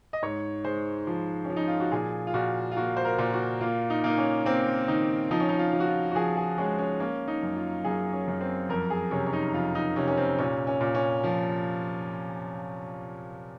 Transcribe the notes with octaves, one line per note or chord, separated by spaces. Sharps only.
D#5
G#2 C#5
G#3 C5
F3
C#4
F3
D#4
F4
F#4
A#2 G#4
F4
A#2 F#4
F4
A#3 F#4
C5
A#4
A#2
F#4
A#3 F4
D#4
A#3 D#4
C#4
A#3 C4
D#3 D#4
F3 D#4
C#4
D#4
F4
F3
F#4
F4
F#4
F3 G#4
G#4
G#3 C#4
C#4
A#3 C#4
D#4
F#2
F4
F#2 G#4
C#4
F#2
C4
F2 A#4
G#4
C3 C#4
C#4
D#4
F2 F4
D#4
C3 C#4
C#4
C4
A#2 C#4
C#4
A#2
C#4
F3